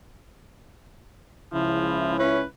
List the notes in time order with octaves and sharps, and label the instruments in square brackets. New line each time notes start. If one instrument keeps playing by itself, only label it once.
[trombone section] C#2 C#3 E4 [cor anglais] F3
[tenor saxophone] C#4 [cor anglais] B4